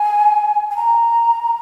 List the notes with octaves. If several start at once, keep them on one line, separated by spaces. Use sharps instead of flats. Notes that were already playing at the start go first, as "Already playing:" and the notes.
Already playing: G#5
G#5
A#5